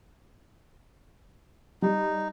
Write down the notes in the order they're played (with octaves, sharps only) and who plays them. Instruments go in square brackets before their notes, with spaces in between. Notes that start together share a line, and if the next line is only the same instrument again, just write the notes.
[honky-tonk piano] G3 [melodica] D#4